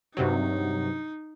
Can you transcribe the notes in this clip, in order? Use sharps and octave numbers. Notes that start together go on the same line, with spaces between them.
G2 C3 F#3 D#4